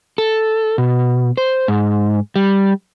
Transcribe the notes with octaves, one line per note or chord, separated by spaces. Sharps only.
A4
B2
C5
G#2
G3